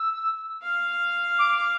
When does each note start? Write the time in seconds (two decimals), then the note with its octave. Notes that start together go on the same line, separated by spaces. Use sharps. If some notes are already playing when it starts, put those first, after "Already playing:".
Already playing: E6
0.63 F5
1.39 D6